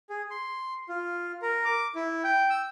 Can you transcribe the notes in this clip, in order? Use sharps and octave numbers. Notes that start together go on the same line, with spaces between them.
G#4
C6
F4
A#4
D6
E4
G5
E6